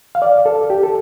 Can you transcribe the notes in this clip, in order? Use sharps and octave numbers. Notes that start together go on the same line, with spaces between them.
F5
D5
A4
G4
A4